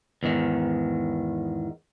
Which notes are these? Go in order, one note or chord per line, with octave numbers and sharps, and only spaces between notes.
E2 G#2 D#3